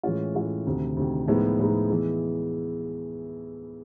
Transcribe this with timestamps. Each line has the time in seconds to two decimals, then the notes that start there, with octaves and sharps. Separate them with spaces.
0.03 A2 E3 G#3 C#4 F4
0.34 A2 E3 G#3 C#4 F4
0.67 D2 C3 D#3
0.97 D2 C3 D#3
1.27 A2 F3 G#3 B3 D#4
1.59 A2 F3 G#3 B3 D#4
1.90 E3 G#3 B3